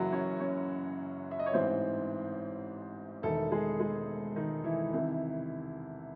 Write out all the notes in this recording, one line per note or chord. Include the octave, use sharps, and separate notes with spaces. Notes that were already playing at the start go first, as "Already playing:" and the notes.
Already playing: F#1 F#2 C#3 E3 F#3 F#4
C#4 C#5
C#4 C#5
E5
D#5
C#5
A1 G#2 E3 C4 C5
E1 E2 D#3 A3 A4
G#3 G#4
G#3 G#4
D#3 D#4
E3 E4
C2 C3 D#3